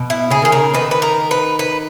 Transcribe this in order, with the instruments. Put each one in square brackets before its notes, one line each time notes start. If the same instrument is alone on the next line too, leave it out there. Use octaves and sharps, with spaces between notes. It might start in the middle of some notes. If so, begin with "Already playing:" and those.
Already playing: [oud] B2
[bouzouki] E4
[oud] C#3 [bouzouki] G#4
[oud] D#3 [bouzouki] G#4
[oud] C#3 [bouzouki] A#4
[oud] D#3 [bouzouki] B4
[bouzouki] B4
A#4
B4
B4